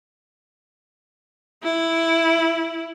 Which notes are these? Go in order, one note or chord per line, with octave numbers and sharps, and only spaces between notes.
E4